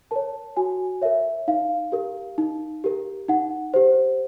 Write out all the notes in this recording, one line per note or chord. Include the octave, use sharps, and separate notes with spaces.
A#4 C#5 A5
F#4 G#5
A#4 C#5 E5
D#4 F5
G4 A#4
D#4
G4 A#4
D#4 F#5
G4 C5